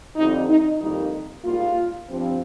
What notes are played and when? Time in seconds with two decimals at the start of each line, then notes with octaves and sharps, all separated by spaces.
0.16 F2 D3 G3 C4 D#4
0.49 D#4
0.80 F2 D#3 G3 A#3 D#4
1.45 G#2 G3 A#3 F4
2.09 G2 F3 C4